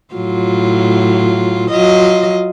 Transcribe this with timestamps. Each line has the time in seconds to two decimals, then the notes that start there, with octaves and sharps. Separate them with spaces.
0.14 A2 F#3 F4
1.71 F#3 F4 D#5